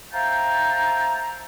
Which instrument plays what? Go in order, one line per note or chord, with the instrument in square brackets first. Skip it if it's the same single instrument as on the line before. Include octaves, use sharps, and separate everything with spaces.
[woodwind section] C5 E5 F5 G5 A5 A#5